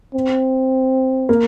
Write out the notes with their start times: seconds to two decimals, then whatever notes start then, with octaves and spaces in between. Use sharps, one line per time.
0.14 C4
1.29 A#3